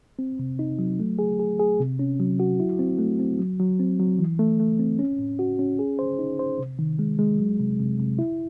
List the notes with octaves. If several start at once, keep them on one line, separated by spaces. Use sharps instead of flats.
C4
C3
D#4
F#3
A3
G#4
G#4
G#4
C3
C#4
F#3
F#4
E4
C4
A3
C4
F#3
F#3
C4
F#3
E3
A3
A3
C4
C#4
A2
F#4
C#4
G#4
C5
D#4
C5
C3
D#3
G#3
G#3
F#3
C3
C3
C3
E4